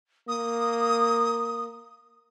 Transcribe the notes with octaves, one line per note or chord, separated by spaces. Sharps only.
A#3 D#6